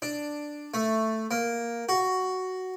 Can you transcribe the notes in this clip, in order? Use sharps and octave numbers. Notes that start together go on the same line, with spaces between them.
D4
A3
A#3
F#4